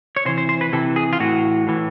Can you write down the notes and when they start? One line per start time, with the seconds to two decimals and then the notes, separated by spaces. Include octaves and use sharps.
0.16 C#5
0.25 C3 E3 C5
0.38 C5
0.49 C5
0.61 B4
0.73 C3 E3 A4
0.96 G#4
1.13 F4
1.20 A2 E3 F#4
1.67 A2 E3